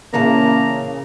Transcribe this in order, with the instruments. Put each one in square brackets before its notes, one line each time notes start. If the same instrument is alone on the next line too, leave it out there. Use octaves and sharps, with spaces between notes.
[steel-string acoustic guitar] A#2 E3 A5 [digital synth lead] C#3 [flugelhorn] A#3 [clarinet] A#5